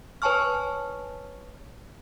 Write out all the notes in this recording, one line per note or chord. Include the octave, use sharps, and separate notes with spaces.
B4 C#5 G#5 A5 C#6 F6